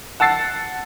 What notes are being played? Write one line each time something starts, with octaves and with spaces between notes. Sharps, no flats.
F#5 A5 E6 A6 C7